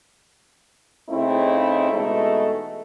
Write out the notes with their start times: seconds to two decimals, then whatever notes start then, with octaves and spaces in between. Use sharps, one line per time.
1.09 C#3 A3 C4 D#4 E4
1.92 B2 E3 G#3 A3 D#4 A4